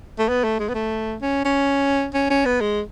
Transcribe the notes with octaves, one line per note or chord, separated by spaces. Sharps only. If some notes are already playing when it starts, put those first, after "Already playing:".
A3
B3
A3
G#3
B3
A3
C#4
C#4
C#4
C#4
B3
G#3